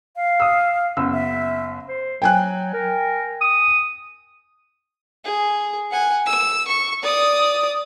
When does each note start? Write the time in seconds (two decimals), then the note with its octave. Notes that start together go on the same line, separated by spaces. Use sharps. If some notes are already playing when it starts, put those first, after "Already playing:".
0.16 F5
0.40 D#6 E6
0.97 F#1 B3 E6
1.13 E5
1.88 C5
2.22 F#3 G5 G#5 F#6
2.74 A#4
3.41 D#6
5.25 G#4
5.91 F#5 G#5
6.26 E6
6.68 C#6
7.03 D5 D#6